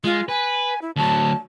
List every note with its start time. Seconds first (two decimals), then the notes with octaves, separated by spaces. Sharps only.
0.04 G#3 F4
0.28 B4 G#5
0.82 E4
0.96 D2 F#3 A5